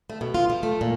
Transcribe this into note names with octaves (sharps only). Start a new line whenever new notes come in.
A3
B2
F4
F3
A3
A#2